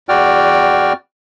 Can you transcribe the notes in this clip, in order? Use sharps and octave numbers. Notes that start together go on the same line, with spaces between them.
E2 F#4 D5 G5 F6